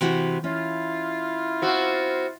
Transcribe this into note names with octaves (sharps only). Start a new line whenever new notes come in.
C3 E3 F#4
C#4 E4 F4
C4 F#4